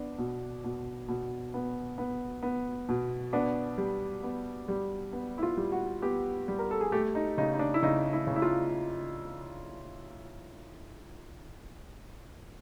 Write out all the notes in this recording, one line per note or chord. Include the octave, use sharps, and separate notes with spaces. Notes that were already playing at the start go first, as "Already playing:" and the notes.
Already playing: B3 D4
B2
B2
B2
B3
B3
B3
B2
B3 D4
G3
B3
G3
B3
E4
F4
G3
F#4
B3 G4
G3
A#4
A4
G#4
A3 G4
D#4
C#3 D#4
D#4
D4
E4
C#3 D#4
E4
C#3
E4
F4